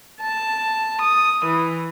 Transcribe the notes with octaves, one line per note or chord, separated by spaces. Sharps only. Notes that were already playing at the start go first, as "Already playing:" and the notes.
A5
D#6
E3